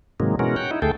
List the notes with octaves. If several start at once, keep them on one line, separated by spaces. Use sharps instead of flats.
G#2 C3 D#3 F#3 G#3 A#3
B2 E3 G#3 C#4 F#4 A#4
C#5 F#5 G5
D#4 E4
D2 A3 G#4 A4 G5